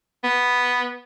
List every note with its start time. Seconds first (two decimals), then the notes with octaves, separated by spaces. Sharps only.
0.24 B3